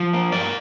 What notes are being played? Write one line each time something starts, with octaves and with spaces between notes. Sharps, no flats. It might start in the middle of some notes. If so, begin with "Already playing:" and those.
Already playing: F3
A#3
G2 A#4 D5